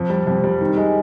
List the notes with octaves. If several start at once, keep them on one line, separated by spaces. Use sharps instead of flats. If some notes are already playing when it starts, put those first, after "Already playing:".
Already playing: F2
G3
F2
G3
D#3
G#3